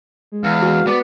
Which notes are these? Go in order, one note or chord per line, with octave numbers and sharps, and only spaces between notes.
G#3
E2 F5
F#4
B3 D5